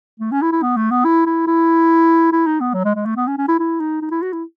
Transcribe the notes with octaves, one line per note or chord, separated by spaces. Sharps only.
A3
C#4
E4
E4
B3
A3
B3
E4
E4
E4
E4
D#4
B3
F#3
G#3
G#3
A3
B3
C#4
C#4
E4
E4
D#4
D#4
E4
F#4
E4